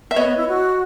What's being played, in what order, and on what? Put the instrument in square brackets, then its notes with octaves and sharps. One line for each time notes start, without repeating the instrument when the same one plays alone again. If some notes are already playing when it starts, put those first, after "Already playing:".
[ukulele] E5
[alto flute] B3 [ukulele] C#5 D#5
[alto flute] B3
E4
F#4